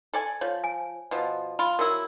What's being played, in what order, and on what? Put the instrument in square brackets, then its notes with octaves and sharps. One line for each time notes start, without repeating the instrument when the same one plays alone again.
[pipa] A4 D5 G#5
[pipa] F3 [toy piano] C#5
[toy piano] G#5
[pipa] B2 F3
[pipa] F4 [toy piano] B5
[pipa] F#3 E4 [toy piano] A#4 E6